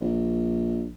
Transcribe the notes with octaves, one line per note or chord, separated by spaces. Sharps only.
A#1